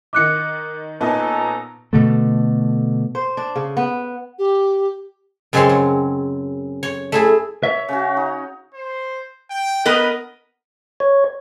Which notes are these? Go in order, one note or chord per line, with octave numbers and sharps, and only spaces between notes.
D#3 D#4 D6 F#6 C#7
A#2 B3 C#4 D#4 A4 A5 A#5
B2 D3 A3
C5
D4
C#3
B3
G4
F#2 C#3 G#3 C4 C#5 C6
F#3
C#5
A3 E4 G#4
C#5 E5
C#3 C#4 F#4
D#4
C5
G5
B3 A#4 B4 D#5
C#5